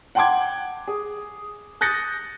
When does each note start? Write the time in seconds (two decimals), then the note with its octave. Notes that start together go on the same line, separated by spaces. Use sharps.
0.15 F#5 G5 A5 C6 D6 G#6
0.88 G#4
1.81 D#6 F#6 G6 A6 A#6 C#7